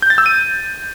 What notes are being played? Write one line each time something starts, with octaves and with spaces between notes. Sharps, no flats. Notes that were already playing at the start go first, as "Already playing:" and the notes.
G6
A6
E6
D#7